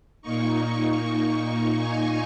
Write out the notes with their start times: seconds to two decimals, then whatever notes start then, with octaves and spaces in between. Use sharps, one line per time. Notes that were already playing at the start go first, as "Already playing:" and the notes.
0.22 A#2 A#3 D#4 C#6
1.78 G#5